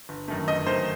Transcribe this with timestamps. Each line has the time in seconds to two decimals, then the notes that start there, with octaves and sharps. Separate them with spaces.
0.09 G1
0.28 F#2 D#3 A3
0.48 G1 D#5
0.67 F#2 D#3 A3 C5